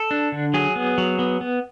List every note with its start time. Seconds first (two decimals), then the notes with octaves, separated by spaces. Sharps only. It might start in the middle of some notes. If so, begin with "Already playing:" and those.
Already playing: A4
0.11 D4
0.32 D3
0.54 F#3 G#4
0.76 B3
0.98 F#3
1.19 B3
1.41 B3